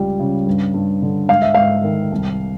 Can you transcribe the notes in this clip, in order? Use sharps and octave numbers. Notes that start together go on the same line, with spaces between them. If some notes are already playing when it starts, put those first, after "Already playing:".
Already playing: C#2 F3 G3
C#3
G2
G2
D3
G#2 F5
E5
G#2 F5
D#3
C2